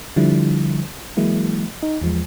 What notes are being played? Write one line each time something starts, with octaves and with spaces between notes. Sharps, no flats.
D3 F3 G3 E4
E3 F#3 G#3 A#3 E4
D#4
E2 F3 G#3